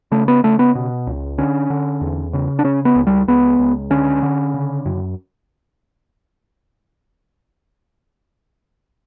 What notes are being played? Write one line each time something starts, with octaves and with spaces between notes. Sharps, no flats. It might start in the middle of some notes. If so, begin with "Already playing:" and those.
C#3 A3
B3
C#3 A3
B3
B2
C#2
D3 C#4
D3
E2
C#3
D4
C#3 C#4
B3
C#2
G3
C#2 B3
C#2
D3 C#4
D3
C#3
F#2